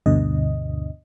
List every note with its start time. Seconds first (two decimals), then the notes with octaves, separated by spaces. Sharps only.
0.06 D2 G2 B2 D3 D#5